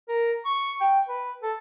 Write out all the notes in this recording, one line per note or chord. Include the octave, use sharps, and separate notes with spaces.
A#4
C#6
G5
B4
A4